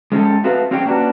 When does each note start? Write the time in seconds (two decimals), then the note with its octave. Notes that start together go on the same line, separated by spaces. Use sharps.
0.12 G#3 C#4 G4 A4
0.44 A3 C4 F#4 A4 B4 F5
0.71 C4 C#4 G4 G#4 C#5 G5
0.85 A#3 C#4 D4 F#4 B4